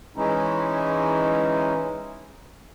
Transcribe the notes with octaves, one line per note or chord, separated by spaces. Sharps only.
E3 G#3 C#4 D#4 E4